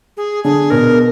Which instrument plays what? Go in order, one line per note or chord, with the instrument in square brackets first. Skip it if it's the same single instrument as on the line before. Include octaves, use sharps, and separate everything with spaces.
[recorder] G#4
[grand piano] D3 [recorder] G#4
[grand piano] B2 [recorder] A#4